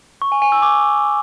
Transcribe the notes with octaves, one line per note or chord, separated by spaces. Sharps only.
C#6
G#5
G#5
E6
D6